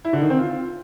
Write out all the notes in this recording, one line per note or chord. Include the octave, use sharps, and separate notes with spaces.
E4
D3
D#3
C4
F4